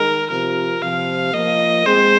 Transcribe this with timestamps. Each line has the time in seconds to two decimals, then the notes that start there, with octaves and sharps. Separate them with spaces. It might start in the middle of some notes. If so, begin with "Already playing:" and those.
Already playing: D#3 G#3 A#4
0.31 C3 F3 A#4
0.82 C3 F3 F5
1.34 F3 A#3 D#5
1.86 G#3 C4 C5